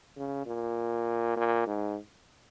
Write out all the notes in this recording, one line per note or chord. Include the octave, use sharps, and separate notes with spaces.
C#3
A#2
A#2
G#2